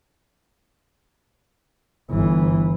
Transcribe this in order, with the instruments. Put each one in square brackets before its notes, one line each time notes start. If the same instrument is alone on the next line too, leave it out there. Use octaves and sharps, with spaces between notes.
[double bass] G1 E3